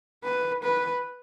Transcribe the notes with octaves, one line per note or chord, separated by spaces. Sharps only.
B4
B4